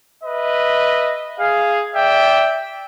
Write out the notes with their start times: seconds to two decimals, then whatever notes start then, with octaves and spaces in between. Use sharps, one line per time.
0.24 B4 D#5 E5
1.38 G#4 F5
1.95 D5 E5 G5